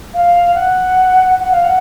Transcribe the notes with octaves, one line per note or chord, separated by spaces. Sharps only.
F5
F#5
F#5
F5
F#5